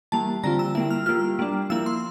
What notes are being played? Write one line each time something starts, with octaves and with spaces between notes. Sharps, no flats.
E3 G3 A#3 A5
D3 G3 C4 F4 A#5
E6
G3 A#3 E4 E6
F6
G3 A#3 F4 F6
G3 A#3 D4
F3 A#3 E4 E6
C6